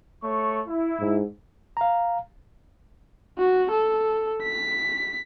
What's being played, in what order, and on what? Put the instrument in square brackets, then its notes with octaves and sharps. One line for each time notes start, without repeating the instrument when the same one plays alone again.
[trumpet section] A3 C#5 C#6
E4
[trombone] G#2
[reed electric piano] F5 A#5
[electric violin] F#4
A4
B6